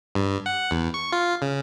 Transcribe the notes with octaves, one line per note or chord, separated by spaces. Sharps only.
G2
F#5
E2
C#6
F4
C#3